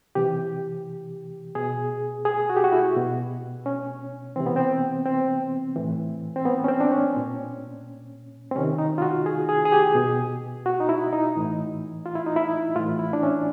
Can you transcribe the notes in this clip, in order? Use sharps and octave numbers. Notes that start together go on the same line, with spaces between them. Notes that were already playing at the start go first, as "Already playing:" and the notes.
C3 E3 G4
B2 G#4
G#4
F#4
G4
F#4
E4
B2
C#4
C3 E3 C4
B3
C4
C4
A2 E3
C4
B3
C#4
C4
D4
C#4
A#2
C4
C3 D#3 C#4
D#4
F4
F#4
G#4
G#4
G#4
G4
B2
F#4
D#4
E4
D#4
A2 E3
F4
E4
D#4
E4
A2 E3 F4
E4
D4
C#4